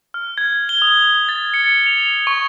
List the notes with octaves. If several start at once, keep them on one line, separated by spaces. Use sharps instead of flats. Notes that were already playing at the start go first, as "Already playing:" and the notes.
F6
G#6
G7
D#6
A6
C#7
F7
C#6